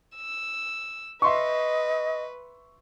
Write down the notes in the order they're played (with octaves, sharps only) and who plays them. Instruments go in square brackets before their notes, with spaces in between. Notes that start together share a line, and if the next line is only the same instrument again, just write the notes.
[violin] E6
[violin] B4 [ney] D#5 [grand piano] E5 C6 C#6